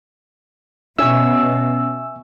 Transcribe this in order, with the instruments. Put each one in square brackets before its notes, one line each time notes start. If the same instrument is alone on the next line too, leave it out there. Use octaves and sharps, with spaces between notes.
[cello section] B2 [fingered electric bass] C#4 [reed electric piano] E5 G#5 C#6 [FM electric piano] E6